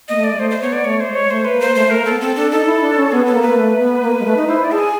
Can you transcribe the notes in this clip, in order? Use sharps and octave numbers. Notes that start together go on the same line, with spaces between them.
A#3 D#5
A3
D5
G#3
A3 C5
C5
B3 C#5
D5
A3 C#5
C5
G#3
C#5
A3 C5
B4
A#3
C5
A3 C5
A3
A#4
A#3
B3 A4
C4 A4
D4 A4
D#4 A4
E4
D4
C#4
B3 G#4
B3 A4
A#3
B4
A#3
A3
B3
A#3
G#3
A3
D#4
E4 C5
D5
G#4 A5
G#5